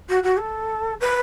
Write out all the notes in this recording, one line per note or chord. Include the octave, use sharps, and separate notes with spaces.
F#4
F#4
A4
B4